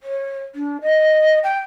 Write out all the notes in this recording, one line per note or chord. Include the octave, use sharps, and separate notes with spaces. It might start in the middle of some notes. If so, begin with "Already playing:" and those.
C#5
D4
D#5
G5